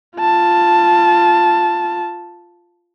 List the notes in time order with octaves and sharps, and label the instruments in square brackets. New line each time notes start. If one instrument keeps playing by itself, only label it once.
[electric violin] F4 A5